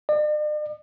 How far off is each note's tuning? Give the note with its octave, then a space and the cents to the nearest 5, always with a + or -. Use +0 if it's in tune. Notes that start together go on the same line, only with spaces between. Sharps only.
D5 +45